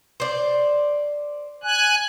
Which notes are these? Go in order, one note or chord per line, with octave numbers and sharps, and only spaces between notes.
C5 D5
G#5 F#6